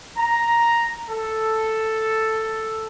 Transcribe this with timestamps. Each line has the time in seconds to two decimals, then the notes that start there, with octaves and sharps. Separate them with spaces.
0.17 A#5
1.10 A4